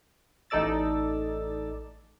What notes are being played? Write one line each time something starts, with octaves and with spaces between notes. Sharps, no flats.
A1 D#4 A4 D5 E6 A6